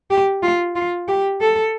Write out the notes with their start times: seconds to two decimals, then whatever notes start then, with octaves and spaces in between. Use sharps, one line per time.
0.10 G4
0.43 F4
0.76 F4
1.08 G4
1.41 A4